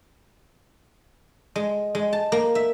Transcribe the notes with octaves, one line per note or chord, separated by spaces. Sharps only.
G#3
G#3
A5
A#3
E5